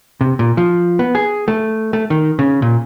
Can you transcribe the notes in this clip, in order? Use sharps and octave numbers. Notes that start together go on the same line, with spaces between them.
C3
A#2
F3
B3
G#4
A3
A3
D#3
C#3
A#2